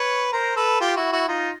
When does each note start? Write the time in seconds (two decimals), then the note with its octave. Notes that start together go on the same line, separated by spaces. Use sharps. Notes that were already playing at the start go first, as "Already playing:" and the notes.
Already playing: B4 C#5
0.32 A#4 C5
0.56 A4 B4
0.80 F4 G4
0.96 E4 F#4
1.12 E4 F#4
1.28 D#4 F4